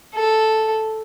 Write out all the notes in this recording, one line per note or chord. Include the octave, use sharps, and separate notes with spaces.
A4